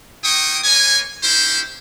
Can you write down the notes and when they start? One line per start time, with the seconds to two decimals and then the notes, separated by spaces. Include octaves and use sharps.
0.24 A#3 E4 G5 C#6 D#6
0.64 A#3 B4 C#5 G#5
1.22 C#4 D#4 E4 G4 C5